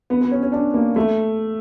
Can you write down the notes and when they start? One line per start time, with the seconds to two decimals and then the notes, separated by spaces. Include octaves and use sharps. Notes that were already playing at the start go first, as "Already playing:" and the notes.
0.10 B3
0.21 B3
0.31 C#4
0.43 C#4
0.52 D4
0.74 A#3
0.96 A3